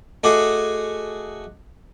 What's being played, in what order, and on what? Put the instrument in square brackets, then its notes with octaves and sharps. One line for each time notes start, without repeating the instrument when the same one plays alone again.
[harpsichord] A3 F#4 G#4 [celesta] D#5 D6